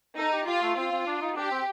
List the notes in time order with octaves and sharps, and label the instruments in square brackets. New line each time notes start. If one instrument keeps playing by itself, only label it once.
[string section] D#4 [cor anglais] A4
[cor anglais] G4
[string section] F4 [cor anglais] G4
[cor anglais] A3
[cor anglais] C4 [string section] F4
[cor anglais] C4
D4
D#4
[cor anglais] D4 [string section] G4
[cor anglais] C4